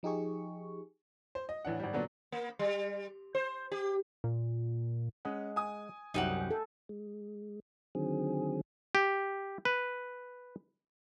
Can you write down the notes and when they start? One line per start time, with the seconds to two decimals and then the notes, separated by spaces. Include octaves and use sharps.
0.03 F3 D#4 G4 G#4 C#6
1.35 C5
1.49 D#5
1.65 A1 E3 D4 F#5
1.80 G#1 G3
1.93 A#2 D3 F#3 B3 D4
2.32 A#3
2.59 G3
3.35 C5
3.72 G4
4.24 A#2
5.25 G#3 C#4 D#5 F#5
5.56 G#5 D#6
6.14 C2 F#2 F#3 D#4 G4 F#5
6.51 A4
6.89 G#3
7.95 D3 D#3 F#3 C4 G#4
8.95 G4
9.65 B4